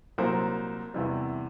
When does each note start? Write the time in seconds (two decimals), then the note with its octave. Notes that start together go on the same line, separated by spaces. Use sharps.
0.18 C2 A#2 F#3 A#4 C5
0.94 E2 C3 E3 G3